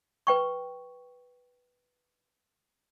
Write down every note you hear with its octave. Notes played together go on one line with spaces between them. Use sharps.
B4 G5 C#6